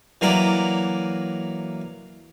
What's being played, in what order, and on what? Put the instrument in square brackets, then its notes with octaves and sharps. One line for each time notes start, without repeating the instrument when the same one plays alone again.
[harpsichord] E3 F#3 A#3 A#4 D5